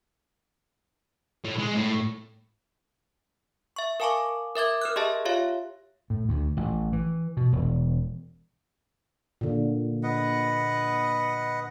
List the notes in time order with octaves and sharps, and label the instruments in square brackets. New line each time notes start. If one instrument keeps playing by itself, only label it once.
[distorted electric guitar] A2
G#3
A2
[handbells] E5 C#6
A#4 F5 G#5 A5 C#6 D6
A#4 E5 D6 G#6
A#4 F6 F#6
G4 G#4 D#5 E5 A5
F4 G4 C#5 E5 F5
[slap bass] A2
D2
A1
E3
B2
E1
[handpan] A#2 D3
[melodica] B4 D#5 F#5